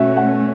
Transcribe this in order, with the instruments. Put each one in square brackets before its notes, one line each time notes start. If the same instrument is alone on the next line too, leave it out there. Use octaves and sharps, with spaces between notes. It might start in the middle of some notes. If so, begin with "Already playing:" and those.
Already playing: [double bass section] B2 A3 C#4 [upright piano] F#4 E5
[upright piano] F#5